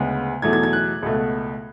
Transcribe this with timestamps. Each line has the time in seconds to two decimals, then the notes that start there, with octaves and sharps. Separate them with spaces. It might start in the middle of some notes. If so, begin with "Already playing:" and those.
Already playing: D2 C#3 G#3 B3
0.42 E2 B2 F#3 A3 G#6
0.53 G#6
0.63 G#6
0.73 F#6
1.03 C#2 B2 A3